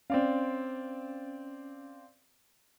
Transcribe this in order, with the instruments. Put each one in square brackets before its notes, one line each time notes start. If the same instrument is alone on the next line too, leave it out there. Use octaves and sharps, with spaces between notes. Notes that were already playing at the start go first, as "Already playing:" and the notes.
[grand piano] C4 D5 F5 [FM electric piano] C#4